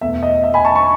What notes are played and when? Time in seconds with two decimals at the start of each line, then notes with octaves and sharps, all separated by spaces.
0.01 E2 B2 A3 E5
0.23 D#5
0.43 E5
0.54 G#5 B5
0.65 A5 C#6
0.75 A5 C#6